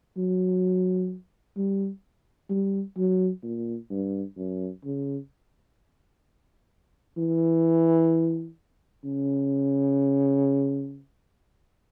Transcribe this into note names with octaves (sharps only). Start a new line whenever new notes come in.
F#3
G3
G3
F#3
A#2
G2
F#2
C#3
E3
C#3